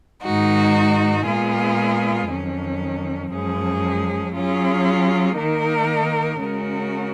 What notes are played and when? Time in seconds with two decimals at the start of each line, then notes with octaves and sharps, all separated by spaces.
0.23 G#2 D#3 G#3 D#4 F#4
1.25 A#2 G#3 B3 F4 G#4
2.28 F2 D#3 F#3 C#4
3.31 F#2 F3 G#3 C#4 G#4
4.33 F#3 C#4 F4 G#4
5.36 D#3 A#3 D#4 A#4
6.39 C#3 G#3 C#4 F#4 A#4